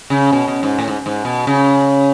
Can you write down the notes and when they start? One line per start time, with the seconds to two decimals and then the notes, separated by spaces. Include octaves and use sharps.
0.10 C#3
0.33 B2
0.48 B2
0.63 G#2
0.79 A2
0.88 G#2
1.06 G#2
1.25 B2
1.47 C#3